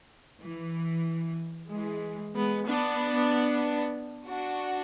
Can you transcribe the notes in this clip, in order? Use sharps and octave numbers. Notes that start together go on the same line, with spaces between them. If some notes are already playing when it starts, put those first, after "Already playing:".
E3
E3 G#3
G#3 B3
B3 D4
D4 F#4